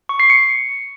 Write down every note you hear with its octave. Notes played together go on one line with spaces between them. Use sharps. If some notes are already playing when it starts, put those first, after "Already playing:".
C#6
C7
C#7